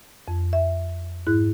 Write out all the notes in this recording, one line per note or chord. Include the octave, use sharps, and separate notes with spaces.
F2
E5
G#2 E4 F#6